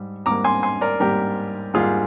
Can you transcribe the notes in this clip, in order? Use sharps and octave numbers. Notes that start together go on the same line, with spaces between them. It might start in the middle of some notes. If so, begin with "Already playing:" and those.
Already playing: G#2 G3
G#2 G3 A#3 A#5 D6
G#5 C6
G#5 C6
A#4 D5
G#2 G3 A#3 G4 A#4
G#2 G3 A#3 F4 G#4